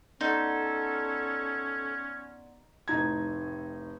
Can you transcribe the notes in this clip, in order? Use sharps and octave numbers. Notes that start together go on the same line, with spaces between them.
B3 C#4 D#4 A4 D5 C6
F1 A2 D#4 G#6